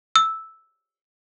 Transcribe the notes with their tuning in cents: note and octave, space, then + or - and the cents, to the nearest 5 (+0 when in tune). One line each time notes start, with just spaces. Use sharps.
E6 -5